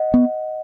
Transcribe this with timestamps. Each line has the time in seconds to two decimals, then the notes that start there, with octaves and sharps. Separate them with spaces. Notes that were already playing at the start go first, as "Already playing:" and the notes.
Already playing: D#5 F#5
0.14 B3